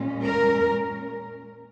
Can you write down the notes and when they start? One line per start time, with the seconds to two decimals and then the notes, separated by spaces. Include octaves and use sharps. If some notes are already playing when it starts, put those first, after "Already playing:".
Already playing: A#2 G#3 C#4
0.24 A#4